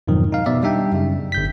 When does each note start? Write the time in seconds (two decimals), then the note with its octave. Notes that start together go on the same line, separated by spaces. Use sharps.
0.07 F2 G#2 B2 D#3 F3 F#3
0.32 D#4 F5
0.46 B2 B3 D5 E5
0.63 G3 D4 D#4 E5 G5
0.92 F#2 C#3
1.32 G1 G6 B6